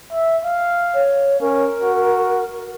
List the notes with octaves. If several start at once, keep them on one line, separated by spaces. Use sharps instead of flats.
E5
F5
C#5
C#4 A#4
F#4